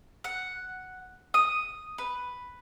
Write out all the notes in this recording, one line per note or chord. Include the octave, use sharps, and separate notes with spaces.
F#5
D#6
B4